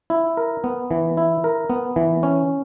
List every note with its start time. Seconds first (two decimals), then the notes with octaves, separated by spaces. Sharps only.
0.10 E4
0.37 A#4
0.64 B3
0.91 E3
1.17 E4
1.44 A#4
1.70 B3
1.96 E3
2.23 C#4